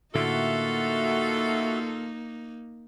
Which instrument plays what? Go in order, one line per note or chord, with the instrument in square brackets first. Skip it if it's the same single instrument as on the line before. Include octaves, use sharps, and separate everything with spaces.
[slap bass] A2 D3 [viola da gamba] A#3 D#4 [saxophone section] F4 A4 [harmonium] F#4 E5